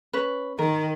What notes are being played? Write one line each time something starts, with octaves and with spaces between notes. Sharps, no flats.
C#4 B4
D#3 A#4